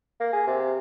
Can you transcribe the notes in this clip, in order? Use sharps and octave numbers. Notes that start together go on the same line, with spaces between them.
A#3
G#4
C3